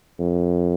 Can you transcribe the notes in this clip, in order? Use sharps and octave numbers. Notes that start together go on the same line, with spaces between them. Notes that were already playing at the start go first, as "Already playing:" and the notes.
F2